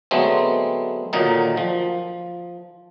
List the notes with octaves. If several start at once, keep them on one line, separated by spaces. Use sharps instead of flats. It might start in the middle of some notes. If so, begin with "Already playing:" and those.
D3 F#3 G#3 A3 B3 C4
A#2 D3 D#3 F#3 D#4
F3